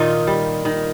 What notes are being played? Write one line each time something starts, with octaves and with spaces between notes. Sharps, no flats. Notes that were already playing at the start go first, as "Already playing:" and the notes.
Already playing: A#2 D#3 D#4 F4
G3
D#3